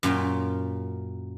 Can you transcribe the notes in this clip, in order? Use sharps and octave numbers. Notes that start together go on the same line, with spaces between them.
F#2 A#2 F4 G5